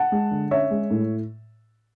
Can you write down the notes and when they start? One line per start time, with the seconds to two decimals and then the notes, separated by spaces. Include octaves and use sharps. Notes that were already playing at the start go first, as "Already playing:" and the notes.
Already playing: F#5 A5
0.12 G#3
0.31 D3
0.51 C#4 C#5 E5
0.71 G#3
0.90 A2